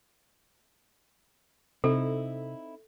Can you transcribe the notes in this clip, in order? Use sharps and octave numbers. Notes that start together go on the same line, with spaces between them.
C3 C4 D#4 E4 A4